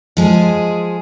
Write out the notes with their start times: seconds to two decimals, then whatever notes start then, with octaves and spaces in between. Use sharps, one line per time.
0.17 F3 G#3 G#4